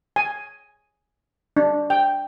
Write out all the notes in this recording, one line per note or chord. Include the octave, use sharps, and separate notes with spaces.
G#5
D4
G5